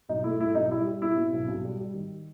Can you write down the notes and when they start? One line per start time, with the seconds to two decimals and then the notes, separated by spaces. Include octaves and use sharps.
0.09 B1 D#4
0.24 A3 E4
0.39 A3 E4
0.55 B1 D#4
0.71 G3 E4
0.87 G3
1.01 B2 E4
1.17 B2
1.33 B1
1.48 B1
1.64 G3
1.80 G3
1.94 D#3